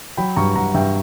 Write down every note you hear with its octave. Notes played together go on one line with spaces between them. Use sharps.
F#3 G5 B5
G2 A#5 C#6
G2 F#5 A#5
G2 E5 G5